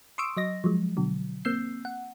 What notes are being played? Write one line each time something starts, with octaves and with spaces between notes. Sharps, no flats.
C6 C#6 D#6 E6 D7
F#3 D#5 A#6
F3 F#3 G#3
B2 D3 F#3
A#3 C4 E6 G6 C7
F#5